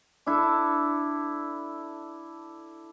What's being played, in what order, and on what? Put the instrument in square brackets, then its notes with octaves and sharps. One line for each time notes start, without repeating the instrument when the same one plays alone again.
[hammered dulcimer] D4 E4 A4